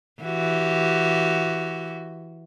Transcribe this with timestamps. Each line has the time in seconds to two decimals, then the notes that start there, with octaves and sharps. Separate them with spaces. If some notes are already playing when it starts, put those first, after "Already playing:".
0.22 E3 F#4 G4